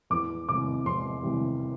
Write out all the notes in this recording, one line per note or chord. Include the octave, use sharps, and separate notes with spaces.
E2 D6
C3 E3 G3 D6
E2 C6
C3 E3 G3